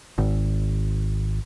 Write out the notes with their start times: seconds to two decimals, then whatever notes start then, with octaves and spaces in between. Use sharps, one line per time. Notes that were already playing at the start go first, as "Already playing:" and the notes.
0.18 G#1